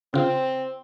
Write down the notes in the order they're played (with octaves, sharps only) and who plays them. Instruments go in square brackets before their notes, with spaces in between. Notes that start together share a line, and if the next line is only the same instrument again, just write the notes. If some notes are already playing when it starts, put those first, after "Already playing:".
[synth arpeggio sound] C#3 F4 [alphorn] C4